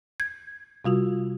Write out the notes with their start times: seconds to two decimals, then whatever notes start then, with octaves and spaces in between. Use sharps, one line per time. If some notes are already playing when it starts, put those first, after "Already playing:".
0.20 G6 G#6
0.85 C3 G3 F4 F#4